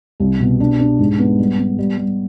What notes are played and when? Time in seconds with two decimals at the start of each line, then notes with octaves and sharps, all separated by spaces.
0.20 C2
0.40 B2
0.60 D4
0.80 D4
0.99 G#2
1.19 B3
1.39 G3
1.58 B3
1.78 G3
1.97 G3